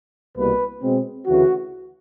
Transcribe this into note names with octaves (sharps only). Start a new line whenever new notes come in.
C2 B2 G3 A#3 B4
B2 G#3 C4
D2 C#3 E3 F#4